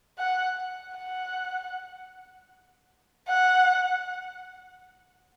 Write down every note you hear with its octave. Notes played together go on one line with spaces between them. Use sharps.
F#5
F#5
F#5